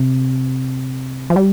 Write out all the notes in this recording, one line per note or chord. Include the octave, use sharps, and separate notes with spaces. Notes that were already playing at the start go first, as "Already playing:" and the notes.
Already playing: C3
F3
G3